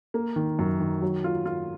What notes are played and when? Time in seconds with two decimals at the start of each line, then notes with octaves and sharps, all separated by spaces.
0.14 A#3
0.36 D#3
0.59 F#2
0.80 D#3
1.02 F#3
1.24 F4
1.46 F4